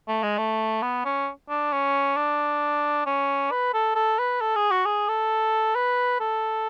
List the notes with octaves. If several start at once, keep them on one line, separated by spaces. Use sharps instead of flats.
A3
G#3
A3
B3
C#4
D4
C#4
D4
C#4
B4
A4
A4
B4
A4
G#4
F#4
G#4
A4
B4
A4